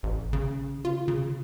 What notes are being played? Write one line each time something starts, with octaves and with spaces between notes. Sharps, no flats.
A1
C#3
F4
C#3